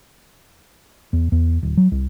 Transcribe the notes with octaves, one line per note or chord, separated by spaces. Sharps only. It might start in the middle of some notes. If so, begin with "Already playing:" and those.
E2
E2
D1
F#3
C2